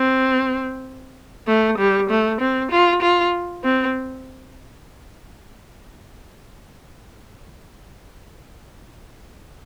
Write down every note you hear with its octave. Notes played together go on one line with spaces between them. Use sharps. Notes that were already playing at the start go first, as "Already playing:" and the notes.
Already playing: C4
A3
G3
A3
C4
F4
F4
C4